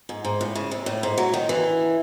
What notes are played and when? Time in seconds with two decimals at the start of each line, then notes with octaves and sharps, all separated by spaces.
0.09 G#2
0.25 G#2
0.41 A2
0.55 C#3
0.71 C3
0.86 A2
1.03 G#2
1.18 F#3
1.34 D#3
1.49 E3